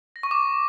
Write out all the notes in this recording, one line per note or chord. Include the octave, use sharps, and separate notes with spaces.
A#6
C#6
D6